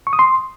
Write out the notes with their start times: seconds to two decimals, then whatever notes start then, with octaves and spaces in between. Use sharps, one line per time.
0.07 C#6
0.13 D#6
0.19 C6